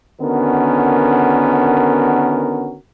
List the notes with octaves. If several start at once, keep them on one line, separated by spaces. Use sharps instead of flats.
D3 D#3 B3 C#4 F#4 A#4